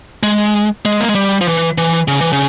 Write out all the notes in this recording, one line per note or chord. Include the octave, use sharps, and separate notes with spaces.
G#3
G#3
A#3
G#3
G3
F3
E3
E3
C#3
E3
C#3